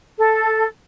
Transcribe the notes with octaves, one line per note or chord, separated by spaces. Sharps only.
A4